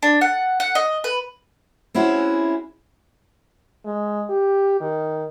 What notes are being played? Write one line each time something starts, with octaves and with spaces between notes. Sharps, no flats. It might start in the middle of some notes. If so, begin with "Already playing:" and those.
D4
F#5
F#5
D#5
B4
C4 C#4 E4 F#4 G#4
G#3
G4
D#3